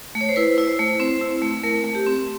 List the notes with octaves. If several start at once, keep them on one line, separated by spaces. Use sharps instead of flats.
A3
C#5
C5
E4 B4
E4
C5
A3
C4 C5
E4
A3
A3 A#4
A3
G4
C4